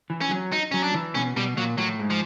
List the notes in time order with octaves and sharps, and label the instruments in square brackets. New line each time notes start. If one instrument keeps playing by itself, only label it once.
[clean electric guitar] E3
[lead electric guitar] C#4
[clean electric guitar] F#3
[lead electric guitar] D#4
[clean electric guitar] F#3 [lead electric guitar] C#4
[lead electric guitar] D4
[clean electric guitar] E3
[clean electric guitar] B2 [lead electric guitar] C#4
[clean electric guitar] B2 [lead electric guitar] G3
[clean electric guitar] A#2 [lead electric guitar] F#3
[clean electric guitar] A2 [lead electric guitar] F#3
[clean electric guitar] G#2
[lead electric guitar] F3